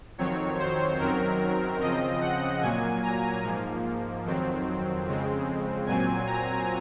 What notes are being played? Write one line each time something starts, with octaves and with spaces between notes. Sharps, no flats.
F2 D#3 F#3 C4 C#5
C5
F#2 D#3 F#3 C4 A#4
C#3 F3 C4 D#5
F#5
A#2 F#3 A#3 G#5
A#5
G#2 F3 A#3
F2 D#3 F#3 C4
F2 C#3 G#3 C4
A#2 F#3 C4 G#5
A#5